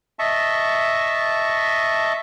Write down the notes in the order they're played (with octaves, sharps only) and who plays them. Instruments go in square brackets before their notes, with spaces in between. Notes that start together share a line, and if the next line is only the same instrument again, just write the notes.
[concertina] D#5 E5 A5 C#6